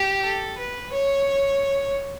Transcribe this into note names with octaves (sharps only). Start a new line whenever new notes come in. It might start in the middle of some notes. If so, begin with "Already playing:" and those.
Already playing: G4
A4
B4
C#5